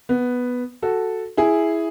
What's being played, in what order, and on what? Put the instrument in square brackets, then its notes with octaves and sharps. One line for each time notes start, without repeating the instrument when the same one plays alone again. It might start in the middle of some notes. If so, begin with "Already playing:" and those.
[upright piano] B3
F#4 A4
E4 G#4